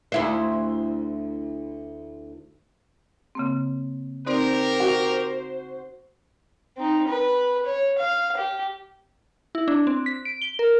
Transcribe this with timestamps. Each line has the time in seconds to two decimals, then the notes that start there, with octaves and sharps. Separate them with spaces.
0.12 D2 E4 C5
3.35 C#3 A#3 C4
4.27 C4 D#4 G4 A#4 C5 D5
4.80 F#4
6.77 C4 D#4
7.08 B4
7.66 C#5
7.98 F5
8.37 G4
9.55 E4
9.68 D4
9.87 C4
10.06 B6
10.25 D7
10.42 G7
10.59 A#4